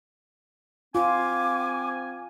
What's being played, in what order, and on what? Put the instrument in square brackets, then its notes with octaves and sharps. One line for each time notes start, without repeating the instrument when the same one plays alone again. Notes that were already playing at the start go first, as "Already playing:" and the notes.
[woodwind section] C4 G#5 [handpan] F4 [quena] D6